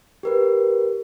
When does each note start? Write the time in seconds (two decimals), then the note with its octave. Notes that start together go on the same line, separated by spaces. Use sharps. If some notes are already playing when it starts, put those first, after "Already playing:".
0.23 G4 A#4 B4